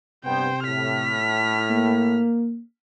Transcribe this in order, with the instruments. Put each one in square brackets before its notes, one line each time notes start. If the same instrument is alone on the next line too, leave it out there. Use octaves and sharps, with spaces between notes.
[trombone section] G2 B3 [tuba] C3 [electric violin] C5 G5
[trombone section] A2 [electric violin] F6 B6
[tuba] A#3